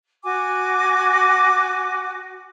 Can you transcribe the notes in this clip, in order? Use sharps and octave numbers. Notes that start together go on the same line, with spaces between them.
F#4 G#5 D6